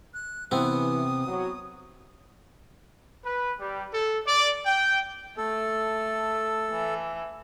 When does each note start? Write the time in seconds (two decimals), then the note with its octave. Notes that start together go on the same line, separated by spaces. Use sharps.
0.14 F#6
0.51 C3 E3 B3 C4 D#6
1.27 F#3
3.24 B4
3.58 G3
3.92 A4
4.26 D5
4.65 G5
5.37 A3 A4
6.72 E3